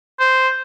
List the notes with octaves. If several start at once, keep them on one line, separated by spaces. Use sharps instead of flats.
C5